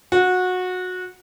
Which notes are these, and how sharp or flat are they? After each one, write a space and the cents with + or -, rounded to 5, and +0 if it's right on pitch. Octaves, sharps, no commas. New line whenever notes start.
F#4 -20